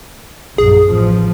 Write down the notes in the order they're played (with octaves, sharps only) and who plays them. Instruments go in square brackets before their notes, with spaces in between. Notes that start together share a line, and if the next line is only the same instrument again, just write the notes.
[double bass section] A#1 F#2 [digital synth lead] G#4
[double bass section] A1 F3